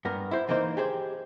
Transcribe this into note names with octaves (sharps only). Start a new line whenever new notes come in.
G2 B3 A#4
E4 C5
E3 A#3 D#4 C5
G4 G#4 C5